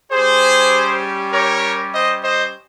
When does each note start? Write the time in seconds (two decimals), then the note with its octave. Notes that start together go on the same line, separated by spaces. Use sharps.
0.12 G3 C#4 G4 G#4 C5
1.33 A#4 C#5
1.94 C5 D#5
2.24 C5 D#5